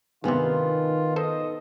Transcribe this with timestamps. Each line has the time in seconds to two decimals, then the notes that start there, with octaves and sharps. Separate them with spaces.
0.24 G2 C3 D#3 B3 D#4 F4 G#5
1.16 A4 C5 D#5